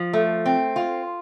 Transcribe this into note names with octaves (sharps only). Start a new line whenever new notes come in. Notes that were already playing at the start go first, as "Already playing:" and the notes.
Already playing: F3
A3
C4
F4